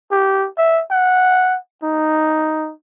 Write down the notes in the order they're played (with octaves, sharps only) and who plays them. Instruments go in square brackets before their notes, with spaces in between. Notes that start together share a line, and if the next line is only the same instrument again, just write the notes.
[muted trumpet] G4
E5
F#5
D#4